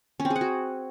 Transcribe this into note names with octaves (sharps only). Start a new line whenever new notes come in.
C#4
C4
G#4
F#5
F#4